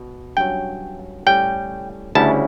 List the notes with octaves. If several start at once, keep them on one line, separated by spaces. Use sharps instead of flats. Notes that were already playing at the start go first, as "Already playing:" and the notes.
Already playing: B2
G2 F#3 C#4 G5
A2 G3 C#4 G5
D2 C#3 G3 C#4 E4 A5